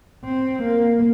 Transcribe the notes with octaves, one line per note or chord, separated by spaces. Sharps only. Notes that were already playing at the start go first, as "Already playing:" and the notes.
C4
A#3